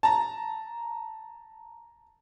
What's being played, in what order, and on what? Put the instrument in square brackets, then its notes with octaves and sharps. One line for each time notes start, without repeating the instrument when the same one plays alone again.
[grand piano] A5 A#5